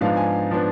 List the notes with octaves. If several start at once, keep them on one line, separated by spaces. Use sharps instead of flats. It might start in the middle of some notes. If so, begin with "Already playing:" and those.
G#2 F3 B3 D4 F5
G#5
F3 B3 D4